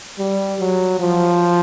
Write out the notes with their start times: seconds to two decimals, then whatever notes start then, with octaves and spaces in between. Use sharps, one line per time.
0.19 G3
0.60 F#3
1.00 F3